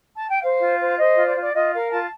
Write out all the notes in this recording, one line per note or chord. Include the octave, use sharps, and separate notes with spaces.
A5
G5
C5 F5
F4
C5
C5 D#5
F4
D5
F4
D5
F4 D#5
A#4 F5
F4 A5